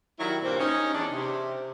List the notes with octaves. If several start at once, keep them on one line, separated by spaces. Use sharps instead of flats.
D#3 F#3 G3 E4
G2 A#2 D#3 A#3 C4
C#4 D#4
E2 D4
C3